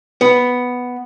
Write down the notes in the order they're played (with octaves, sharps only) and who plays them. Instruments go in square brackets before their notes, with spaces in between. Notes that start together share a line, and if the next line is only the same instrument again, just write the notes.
[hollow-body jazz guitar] B3